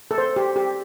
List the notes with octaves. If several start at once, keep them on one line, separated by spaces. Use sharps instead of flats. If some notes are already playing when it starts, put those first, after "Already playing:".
A4
C5
G4
G4